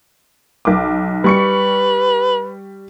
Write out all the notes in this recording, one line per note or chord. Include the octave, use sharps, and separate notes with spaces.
B1 D6
G3 B4 C#6 C#7